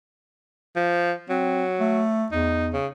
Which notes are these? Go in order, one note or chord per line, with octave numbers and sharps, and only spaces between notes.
F3
F#3 C4
A3
E2 D#4
C#3